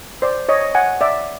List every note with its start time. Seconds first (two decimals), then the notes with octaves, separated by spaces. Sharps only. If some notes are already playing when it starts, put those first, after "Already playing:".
0.22 C5 D5
0.49 C#5 D#5
0.75 F#5 G#5
1.01 D5 E5